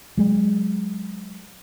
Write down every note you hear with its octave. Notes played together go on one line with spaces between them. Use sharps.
F#3 G#3